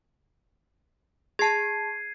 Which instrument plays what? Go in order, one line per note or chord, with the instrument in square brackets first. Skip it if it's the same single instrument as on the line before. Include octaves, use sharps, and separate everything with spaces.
[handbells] G#4 A5 [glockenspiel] G#6 C7 D#7